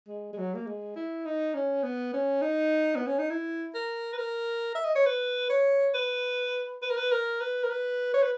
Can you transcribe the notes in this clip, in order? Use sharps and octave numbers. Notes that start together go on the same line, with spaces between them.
G#3
G#3
F#3
A#3
G#3
E4
D#4
C#4
B3
C#4
D#4
B3
C#4
D#4
E4
A#4
B4
A#4
E5
D#5
C#5
B4
C#5
B4
B4
A#4
B4
A#4
B4
A#4
B4
C#5
B4